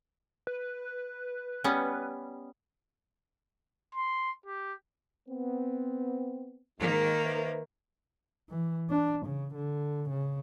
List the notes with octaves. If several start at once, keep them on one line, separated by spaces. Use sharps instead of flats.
B4
G3 B3 C#4
C6
G4
B3 C4
G#2 D#3 A#3
B4 C5 E5
E3
D4
C#3
D3
C#3